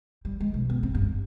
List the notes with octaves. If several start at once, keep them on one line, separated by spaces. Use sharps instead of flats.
G3
G#3
B1
B3
C4
G2
G2